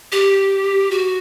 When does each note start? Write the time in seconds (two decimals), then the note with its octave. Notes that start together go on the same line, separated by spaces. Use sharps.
0.12 G4
0.91 F#4